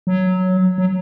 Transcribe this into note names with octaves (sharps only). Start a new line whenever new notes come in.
F#3
F#3